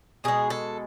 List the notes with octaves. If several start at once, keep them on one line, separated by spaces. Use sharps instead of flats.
B2 G#3 G#4
A4